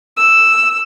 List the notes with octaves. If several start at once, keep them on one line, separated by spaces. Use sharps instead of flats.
E6